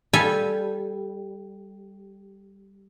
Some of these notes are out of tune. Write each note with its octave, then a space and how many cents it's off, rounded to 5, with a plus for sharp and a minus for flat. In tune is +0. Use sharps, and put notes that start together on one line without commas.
G3 +0 A4 -15 G#5 +0